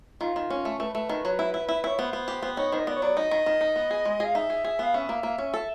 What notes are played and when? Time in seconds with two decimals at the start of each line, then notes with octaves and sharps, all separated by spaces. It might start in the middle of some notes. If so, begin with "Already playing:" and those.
0.21 D#3 F4
0.36 D#3
0.50 C#4
0.65 A3
0.80 A3 B4
0.95 A3
1.09 D#3
1.25 F#3
1.39 E4
1.54 E4
1.69 E4
1.84 E4 C#5
1.99 B3 C5
2.13 B3
2.28 G4
2.43 B3
2.57 D#4 C#5
2.72 D#3 C5
2.79 D#5
2.87 B3 D5
2.96 C#5
3.02 F#3 D5
3.17 D#4 D#5
3.31 D#3
3.46 D#3
3.61 D#4
3.76 B3
3.91 G#4
4.05 G#3
4.20 G#4 F5
4.35 D#4 E5
4.50 G#4
4.64 G#4
4.79 B3 F5
4.94 C#4 E5
5.09 A#3
5.23 A#3
5.38 C#4
5.54 A4